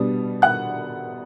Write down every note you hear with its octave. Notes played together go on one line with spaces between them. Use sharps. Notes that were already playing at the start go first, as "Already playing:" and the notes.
Already playing: B2 G3 B3 D4
F#5 F#6